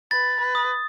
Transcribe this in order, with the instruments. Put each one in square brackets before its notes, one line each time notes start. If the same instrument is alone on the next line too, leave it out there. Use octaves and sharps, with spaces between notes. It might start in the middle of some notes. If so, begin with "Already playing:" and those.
[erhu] B4 [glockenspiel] A6
[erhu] B4
[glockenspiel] D#6